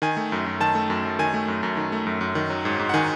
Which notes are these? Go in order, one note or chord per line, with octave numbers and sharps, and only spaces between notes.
D#3 G#5
A3
F#2
F#2
D#3 A5
A3
F#2
F#2
D#3 G#5
A3
F#2
F#2
D#3
A3
F#2
F#2
D#3
F#3
G#2
G#2
F#5
D#3 G#5